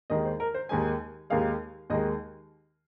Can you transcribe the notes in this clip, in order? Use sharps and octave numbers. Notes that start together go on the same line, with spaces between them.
D#2 D#3 G#3 D#5
C5
A#4
C5
D#2 D#3 G#3 G#5
D#2 D#3 G#3 F5
D#2 D#3 G#3 D#5